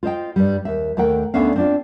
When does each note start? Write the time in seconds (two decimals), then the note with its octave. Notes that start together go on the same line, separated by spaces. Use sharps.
0.03 F4 C5 D#5 G5
0.36 G2 G3
0.65 D#2 E5
0.97 D#2 A3 A#4 F#5 G5
1.34 D2 D3 B3 C#4 E5 F5
1.56 C4 D4 F4